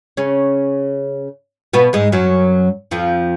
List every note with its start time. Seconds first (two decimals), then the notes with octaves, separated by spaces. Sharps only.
0.17 C#3 C#4
1.73 B2 B3
1.93 G#2 G#3
2.12 F#2 F#3
2.91 F2 F3